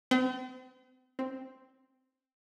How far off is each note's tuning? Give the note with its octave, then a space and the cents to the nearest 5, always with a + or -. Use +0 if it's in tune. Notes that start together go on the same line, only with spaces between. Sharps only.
C4 -40
C4 +0